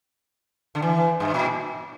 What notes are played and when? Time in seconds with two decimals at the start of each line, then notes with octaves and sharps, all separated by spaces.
0.75 D3
0.82 E3
1.20 G2
1.34 A#2